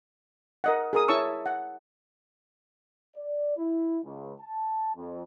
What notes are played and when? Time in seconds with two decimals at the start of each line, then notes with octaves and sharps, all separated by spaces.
0.64 A#4 D#5 F#5
0.93 G#4 A#4 D#6
1.08 E4 C#5 A5 C#6 E6
1.46 F#5
3.17 D5
3.57 E4
4.04 C#2
4.41 A5
4.96 F2